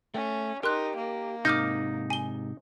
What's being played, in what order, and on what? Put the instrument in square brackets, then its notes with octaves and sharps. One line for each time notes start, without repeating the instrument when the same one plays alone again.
[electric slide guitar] A3 [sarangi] C#4
[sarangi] D#4 [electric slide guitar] G4 [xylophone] A#4 C6 F#6
[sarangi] A#3
[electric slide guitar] G#2 C3 [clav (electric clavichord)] D#4 [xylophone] D6 F6 G6
[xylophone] G#5 G7